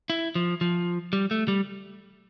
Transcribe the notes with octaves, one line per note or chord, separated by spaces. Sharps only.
E4
F3
F3
G3
A3
G3